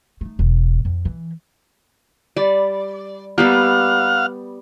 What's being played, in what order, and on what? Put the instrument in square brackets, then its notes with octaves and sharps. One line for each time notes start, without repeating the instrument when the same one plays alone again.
[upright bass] A3 D#4
E1
F2
E3
[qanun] G3 B5 [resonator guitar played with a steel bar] D5
[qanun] G3 B3 G4 [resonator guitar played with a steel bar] A#3 [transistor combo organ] F5 F#5 F6